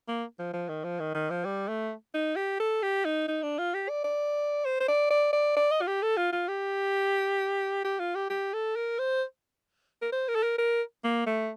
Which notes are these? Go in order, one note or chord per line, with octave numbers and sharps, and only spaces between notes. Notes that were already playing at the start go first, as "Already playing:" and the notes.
A#3
F3
F3
D#3
F3
D#3
D#3
F3
G3
A3
D#4
G4
A4
G4
D#4
D#4
D4
F4
G4
D5
D5
C5
C5
D5
D5
D5
D5
D#5
F4
G4
A4
F4
F4
G4
G4
F4
G4
G4
A4
A#4
C5
A#4
C5
A#4
A4
A#4
A#4
A#3
A3